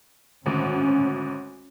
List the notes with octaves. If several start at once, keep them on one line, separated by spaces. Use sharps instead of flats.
G#1 D2 C#4